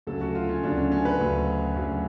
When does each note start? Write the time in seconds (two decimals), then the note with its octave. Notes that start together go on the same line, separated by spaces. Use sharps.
0.07 D2 C#3 F#3 A4
0.21 F#4
0.35 F4
0.49 C#4
0.64 D2 C#3 F#3 D4
0.77 C#4
0.92 C#4
1.05 B4
1.20 D2 C#3 F#3
1.76 D2 C#3 F#3